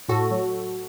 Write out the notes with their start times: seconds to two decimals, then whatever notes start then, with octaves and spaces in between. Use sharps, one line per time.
0.08 A2 F#4 A4
0.31 F#3